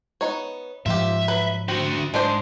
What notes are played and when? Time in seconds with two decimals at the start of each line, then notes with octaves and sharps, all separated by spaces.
0.21 B3 D#4 C#5
0.86 G#2 F3 F4 G4 E5
1.28 F#3 B4
1.68 D3 C4 F#4 G5
2.14 G#2 G#3 D4 C5